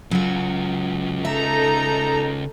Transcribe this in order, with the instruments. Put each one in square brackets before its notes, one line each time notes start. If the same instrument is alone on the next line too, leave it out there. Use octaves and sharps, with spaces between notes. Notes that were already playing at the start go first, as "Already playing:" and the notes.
[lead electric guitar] C#3 F4 [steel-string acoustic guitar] F#3 F#4
[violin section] D#4 A4 A#5 [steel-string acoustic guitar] E5